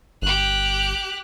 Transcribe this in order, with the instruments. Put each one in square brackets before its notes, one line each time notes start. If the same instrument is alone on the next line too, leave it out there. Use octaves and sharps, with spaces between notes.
[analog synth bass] G1 [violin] G4 F#6